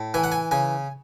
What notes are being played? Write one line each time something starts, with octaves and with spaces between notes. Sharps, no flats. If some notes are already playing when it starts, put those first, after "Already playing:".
Already playing: A2
E3 G#5
F#5
G#5
C#3 G#5